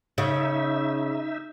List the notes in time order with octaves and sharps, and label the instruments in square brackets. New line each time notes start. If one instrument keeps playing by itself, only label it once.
[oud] C#3 [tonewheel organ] D#4 E5